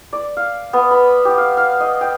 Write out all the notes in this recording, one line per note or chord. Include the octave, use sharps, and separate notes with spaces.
D5
F5
B3
B5
G4
F5
F5
D#5
G5